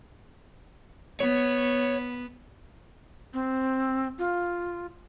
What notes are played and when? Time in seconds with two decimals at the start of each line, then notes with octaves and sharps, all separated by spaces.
1.20 B3 C#5
3.34 C4
4.19 F4